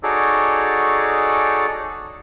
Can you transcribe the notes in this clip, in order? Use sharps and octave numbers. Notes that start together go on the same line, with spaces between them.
D#4 F#4 G#4 A4 C#5 D5